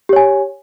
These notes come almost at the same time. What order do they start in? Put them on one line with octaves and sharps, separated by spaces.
G4 C#5 G#5